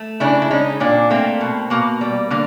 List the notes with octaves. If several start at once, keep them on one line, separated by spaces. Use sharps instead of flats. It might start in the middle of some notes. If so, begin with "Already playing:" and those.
Already playing: A3
C#3 D4 E4
E4
G#3 C#4 D#4
A#2 C4 D4
A3 A#3 C4
B2
B2 A#3
G3
D3 A#3